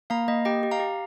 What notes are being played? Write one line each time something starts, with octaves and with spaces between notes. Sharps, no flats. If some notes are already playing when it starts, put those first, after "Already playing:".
A#3 F5 A#5
A#3 D#5
G4 D#5 G5
G4
F5 A#5
G4